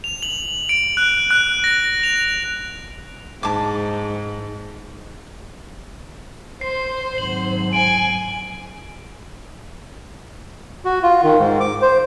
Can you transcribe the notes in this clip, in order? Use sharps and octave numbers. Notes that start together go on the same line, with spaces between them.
F7
F#7
D7
F#6
F#6
A#6
F7
G#2 A5 D6
C5 C7
G#1 F#3 F#7
G#5 D7 F#7
F#4
F4
D#3
G#2
D6
C5